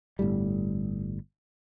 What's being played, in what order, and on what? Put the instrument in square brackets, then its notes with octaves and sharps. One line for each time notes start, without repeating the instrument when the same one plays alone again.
[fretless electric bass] G1 A2 G3